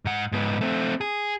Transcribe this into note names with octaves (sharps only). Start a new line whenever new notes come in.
G#2 F#5
G#2 B3
A3 C4
G#4